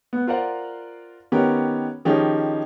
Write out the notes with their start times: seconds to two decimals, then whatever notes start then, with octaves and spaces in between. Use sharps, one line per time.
0.13 B3
0.27 F4 A#4 C5 D5 F5 F#5
1.32 D#3 B3 C#4 G4 A#4
2.05 D#3 F3 C#4 D#4 G4 G#4